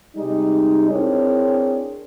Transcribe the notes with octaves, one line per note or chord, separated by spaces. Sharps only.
C3 G3 G#3 D#4
C4 D4 E4 G#4 A#4 C#5